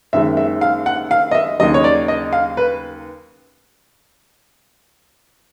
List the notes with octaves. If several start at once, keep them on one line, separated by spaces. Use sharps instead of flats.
F#1 F#2 D#3 G#3 E5
E5
F5
F#5
F5
D#5
E5
D#2 C#3 F#3 D#5
C#5
D5
D#5
F5
B4